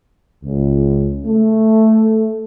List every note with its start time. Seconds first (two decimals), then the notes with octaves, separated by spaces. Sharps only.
0.44 C#2
1.25 A3